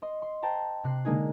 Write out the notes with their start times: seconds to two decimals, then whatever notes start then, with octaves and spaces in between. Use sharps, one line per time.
0.02 D#5 C6
0.22 C6
0.42 C5 G5 A5 A#5
0.84 C3 F#6 C7
1.05 D3 G#3 A#3 D#4 G#4